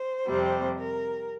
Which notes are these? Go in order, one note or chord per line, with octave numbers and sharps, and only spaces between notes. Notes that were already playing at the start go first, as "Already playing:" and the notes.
Already playing: C5
F2 C3 G3
A#4